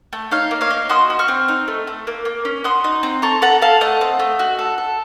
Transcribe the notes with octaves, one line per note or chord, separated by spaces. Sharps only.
A3
D#4 C#5 F5
A#3
C#5 F5
D#4
F#4 C6 D#6
F#4
C#6 F6
C4
D#4
A3
A3
A#3
A#3
C#4
F#4 C6 D#6
D#4
C4
A4 A#5 C#6
A4 F#5 A#5
A4 F5 A5
A3 D#5 F#5
C4
A3
F#4
A4
A4